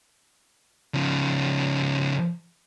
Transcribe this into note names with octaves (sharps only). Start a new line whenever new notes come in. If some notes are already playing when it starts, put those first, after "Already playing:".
C#3 F3